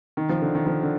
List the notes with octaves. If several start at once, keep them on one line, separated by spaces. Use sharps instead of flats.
D#3
F3
D3
D#3
F3
D3